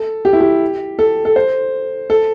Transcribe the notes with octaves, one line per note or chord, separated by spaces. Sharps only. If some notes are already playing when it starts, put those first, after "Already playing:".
Already playing: A4
G4
E4
G4
A4
A4
C5
A4